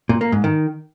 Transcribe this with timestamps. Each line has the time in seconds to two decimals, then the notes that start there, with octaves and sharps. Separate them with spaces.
0.09 A#2
0.21 A#3
0.32 G#2
0.44 D#3